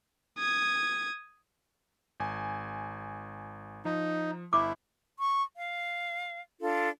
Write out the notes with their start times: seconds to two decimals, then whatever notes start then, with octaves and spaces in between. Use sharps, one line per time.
0.38 D#6 G#6
2.20 G#1 G#5
3.85 F3 D#4
4.53 G1 E4 D6
5.20 C#6
5.57 F5
6.61 D4 F4 A4